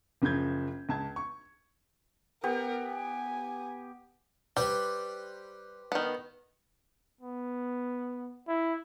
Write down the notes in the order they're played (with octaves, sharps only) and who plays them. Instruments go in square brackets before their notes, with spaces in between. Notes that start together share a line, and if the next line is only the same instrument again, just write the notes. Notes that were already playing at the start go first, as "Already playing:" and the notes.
[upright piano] F#1 C#3 F3 G6 G#6
C#2 A5 G#6
C#6
[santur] B3 G4 [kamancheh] A#4
[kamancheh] G#5
[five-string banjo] G3 [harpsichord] G4 B4 C5
[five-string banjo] D#3 B3
[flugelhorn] B3
E4